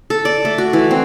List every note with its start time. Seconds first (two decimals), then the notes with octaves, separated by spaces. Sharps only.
0.10 A4
0.25 D5
0.45 A3
0.58 F#4
0.73 E3
0.91 C4